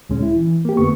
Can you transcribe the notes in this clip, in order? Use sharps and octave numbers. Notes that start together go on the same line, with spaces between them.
D2 A#2 G#3 C#4
E4
E3
A#3 G4
F2 D3 A3 B3 C#6